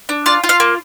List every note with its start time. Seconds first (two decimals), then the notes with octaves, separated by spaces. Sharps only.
0.09 D4
0.26 F4 D5
0.43 F4
0.49 F5
0.60 A#3